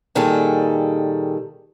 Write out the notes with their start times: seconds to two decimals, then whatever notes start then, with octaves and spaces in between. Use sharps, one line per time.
0.15 A#2 D#3 G3 G#4 A4